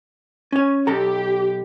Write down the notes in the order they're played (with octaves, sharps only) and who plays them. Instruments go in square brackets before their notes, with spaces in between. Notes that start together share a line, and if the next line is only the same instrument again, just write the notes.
[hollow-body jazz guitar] C#4 C#5
[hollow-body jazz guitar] B1 A4 A#5 [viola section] G4